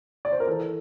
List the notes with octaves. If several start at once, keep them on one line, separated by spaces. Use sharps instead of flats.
D5
C5
A#4
E3 A4